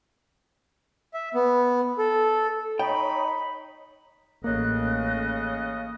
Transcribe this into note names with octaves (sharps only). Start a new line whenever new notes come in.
E5
B3
A4
D#4 C#5 D#5 G5 B5
A1 C#3 A#3 D#5 F#6